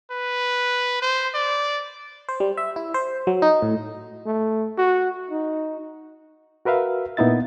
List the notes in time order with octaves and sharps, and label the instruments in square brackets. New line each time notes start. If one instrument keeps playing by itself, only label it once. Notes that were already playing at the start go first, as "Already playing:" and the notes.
[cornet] B4
C5
D5
[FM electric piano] C5
G3
E5
E4
C5
F#3
D#4
A2
[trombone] A3
F#4
D#4
[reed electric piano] F#4 A#4 B4 E5 F5
A#2 B3 D#4 E4 E5 A6